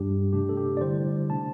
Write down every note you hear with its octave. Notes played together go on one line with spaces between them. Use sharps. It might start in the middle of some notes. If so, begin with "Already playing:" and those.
Already playing: G2 G3 D4 G4
C3 A3 D4 G4
A4
G4
D5
D3 G3 E4 C5
C3 A3 D4 A5